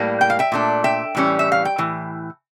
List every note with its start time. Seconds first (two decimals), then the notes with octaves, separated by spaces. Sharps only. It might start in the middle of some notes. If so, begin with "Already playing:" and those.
Already playing: A2 G3 A#3
0.21 G5
0.30 F5
0.39 E5 G5
0.52 A#2 A3 D4
0.84 E5 G5
1.15 A2 E3 G3 C#4
1.39 E5
1.52 F5
1.65 G5
1.78 A2 E3